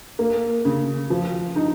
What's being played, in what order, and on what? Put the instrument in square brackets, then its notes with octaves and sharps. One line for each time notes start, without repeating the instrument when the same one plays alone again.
[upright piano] A#3
C#3
F3
D#4